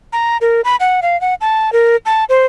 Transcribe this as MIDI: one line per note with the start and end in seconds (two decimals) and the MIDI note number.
0.13 0.37 82
0.41 0.61 70
0.64 0.76 83
0.80 1.00 78
1.02 1.19 77
1.21 1.34 78
1.41 1.72 81
1.73 1.96 70
2.05 2.24 81
2.29 2.46 72